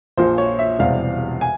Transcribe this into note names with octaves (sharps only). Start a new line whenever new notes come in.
A#1 A#2 F3 C5
C#5
E5
E1 E2 C3 G3 F5
G#5